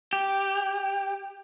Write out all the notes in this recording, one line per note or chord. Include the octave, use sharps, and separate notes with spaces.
G4